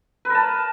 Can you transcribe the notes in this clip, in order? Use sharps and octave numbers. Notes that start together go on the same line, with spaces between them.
A#4 B4 A5